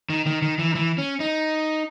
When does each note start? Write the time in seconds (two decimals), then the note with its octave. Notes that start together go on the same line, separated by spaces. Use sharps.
0.10 D#3
0.26 D#3
0.42 D#3
0.59 E3
0.72 D#3
0.75 E3
0.98 C#4
1.20 D#4